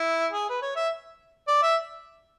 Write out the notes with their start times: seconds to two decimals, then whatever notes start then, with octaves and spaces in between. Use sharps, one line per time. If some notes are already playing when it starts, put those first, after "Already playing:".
Already playing: E4
0.32 G#4
0.50 B4
0.62 C#5
0.76 E5
1.48 D5
1.62 E5